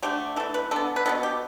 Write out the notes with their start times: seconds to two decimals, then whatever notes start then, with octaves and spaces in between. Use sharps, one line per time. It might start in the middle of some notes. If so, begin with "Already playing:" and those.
0.02 D3 A3 G4
0.36 E3 A4
0.40 A3
0.54 B4
0.71 D3 B3 A4
0.96 B4
1.06 B2 G3 B3 A4
1.23 G4